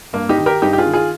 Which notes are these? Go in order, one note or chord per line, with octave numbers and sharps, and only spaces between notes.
G2 A#3
D#4 G4
D#3
G4 A#4
G2 D#4 G4
G4
F4 G#4
D#3
F4 G#4